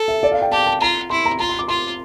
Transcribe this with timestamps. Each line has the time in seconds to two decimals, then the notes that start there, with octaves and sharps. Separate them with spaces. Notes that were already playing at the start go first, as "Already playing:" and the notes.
Already playing: A4
0.08 E5
0.23 D5
0.32 F5
0.42 G5
0.52 G4 A5
0.67 A5
0.81 F4 A#5
1.10 E4 C6
1.26 A#5
1.39 F4 A#5
1.49 C6
1.59 D6
1.68 F4 C6